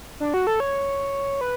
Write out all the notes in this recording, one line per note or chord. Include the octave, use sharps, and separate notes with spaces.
D4
F#4
A4
C#5
B4